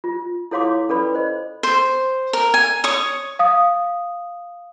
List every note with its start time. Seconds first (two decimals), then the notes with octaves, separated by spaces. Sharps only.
0.04 F4
0.51 E4 A4 C#5 F5 C6 D6
0.89 C#4 A4 B4 D5 B5
1.14 C5 D#5
1.63 C5
2.33 A#4
2.54 G#5
2.84 C#5 C#6 D#6
3.39 F5 D#6